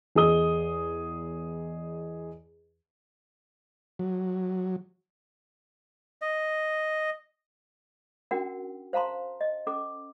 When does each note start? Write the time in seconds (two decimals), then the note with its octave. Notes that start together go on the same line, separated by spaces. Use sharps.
0.15 E2 G#4 D#5 D#6 G7
3.99 F#3
6.22 D#5
8.31 C#4 D4 F#4 A#4 F#5 G5
8.93 C5 F5 A5 A#5 C6
9.41 D#5
9.67 C#4 A4 D6